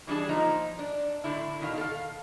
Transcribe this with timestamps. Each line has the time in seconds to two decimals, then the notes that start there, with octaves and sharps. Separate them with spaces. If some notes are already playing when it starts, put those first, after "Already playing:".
0.07 E3 G3 D4 G#4 A5
0.29 A#2 F3 D#4 A#5
0.78 D4 D5
1.24 A2 D3 E4
1.61 B2 D#3 F5
1.77 A4 F5